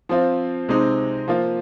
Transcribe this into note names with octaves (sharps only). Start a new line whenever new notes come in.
F3 C4 F4
C3 G#3 C4 D#4
F3 A#3 F4